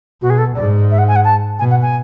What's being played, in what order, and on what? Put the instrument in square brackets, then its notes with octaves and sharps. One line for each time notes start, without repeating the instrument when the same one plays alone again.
[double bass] B2 [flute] F#4
[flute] G#4
A4
[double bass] G#2 [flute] D5
[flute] E5
F#5
G#5
F#5
A5
[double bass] B2 [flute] G#5
[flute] F#5
G#5